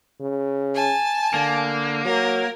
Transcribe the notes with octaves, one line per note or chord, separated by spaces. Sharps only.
C#3
G#5 A5
D3 A#3
F#3 A#4